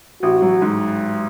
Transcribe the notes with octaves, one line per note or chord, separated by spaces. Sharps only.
A1 F#4
F#3
G#2